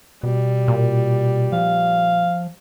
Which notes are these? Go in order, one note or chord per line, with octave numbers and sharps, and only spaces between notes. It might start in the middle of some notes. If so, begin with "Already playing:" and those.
B2 G3
A#2
F3 F5